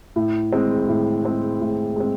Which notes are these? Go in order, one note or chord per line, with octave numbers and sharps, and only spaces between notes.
A2
G#3 C4
A2
G#3 C4
A2
G#3 C4